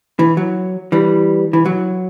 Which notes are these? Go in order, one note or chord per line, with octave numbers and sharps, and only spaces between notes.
E3
F#3
E3 G3
E3
F#3